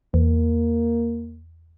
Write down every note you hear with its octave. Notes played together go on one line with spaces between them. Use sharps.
E2 A#3